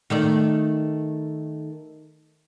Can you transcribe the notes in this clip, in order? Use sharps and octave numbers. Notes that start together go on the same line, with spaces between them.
D#3 A3 D5